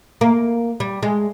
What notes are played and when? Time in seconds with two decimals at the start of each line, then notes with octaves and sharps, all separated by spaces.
0.21 A#3
0.80 G3
1.03 G#3